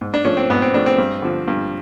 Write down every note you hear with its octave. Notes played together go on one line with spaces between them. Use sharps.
G#2
D4
F3 A3 C#4
C4
G#2 B3
C4
F3 A3 D4
C4
G2
D3 F3
G2